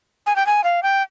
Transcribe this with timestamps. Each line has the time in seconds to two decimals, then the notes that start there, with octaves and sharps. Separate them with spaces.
0.26 G#5
0.36 G5
0.46 G#5
0.64 F5
0.83 G5